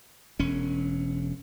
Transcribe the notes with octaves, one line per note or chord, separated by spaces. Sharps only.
E1 C#4